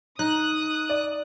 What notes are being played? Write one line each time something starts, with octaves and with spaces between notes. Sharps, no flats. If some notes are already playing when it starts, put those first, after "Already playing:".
D#4 D#6 F#6
D5